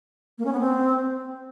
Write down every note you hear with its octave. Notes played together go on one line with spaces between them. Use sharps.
A#3
C#4
B3
C4